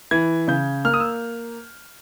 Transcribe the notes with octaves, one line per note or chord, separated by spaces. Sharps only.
E3 G#6
C#3 G6
A#3 F6
D#6
E6